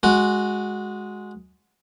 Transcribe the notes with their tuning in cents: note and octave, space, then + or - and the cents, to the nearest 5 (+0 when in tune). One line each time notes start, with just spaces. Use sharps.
G#3 +0 F#4 -5